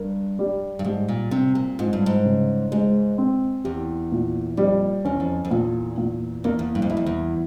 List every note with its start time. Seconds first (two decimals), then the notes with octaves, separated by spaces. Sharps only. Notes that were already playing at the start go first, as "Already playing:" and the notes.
Already playing: G2 A#4
0.39 G3
0.79 G2
0.85 G#2 G3
1.09 A#2
1.31 C3 C4
1.55 A#2
1.79 G#2 F4
1.93 G2
2.06 G#2
2.24 C#3
2.72 G#2 G#3
3.18 C4
3.65 E2 G4
4.12 A#2
4.57 F2 G3
5.05 E2 C#4
5.20 F2
5.45 F2
5.51 E2 A#2
5.98 A#2
6.44 E2 A#3
6.59 E2
6.75 G2
6.82 F2
6.90 E2 E4
6.97 F2
7.06 E2